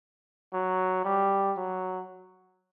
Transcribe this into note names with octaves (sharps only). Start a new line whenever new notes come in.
F#3
G3
F#3